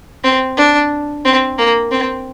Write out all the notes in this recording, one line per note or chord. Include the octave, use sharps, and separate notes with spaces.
C4
D4
C4
A#3
C4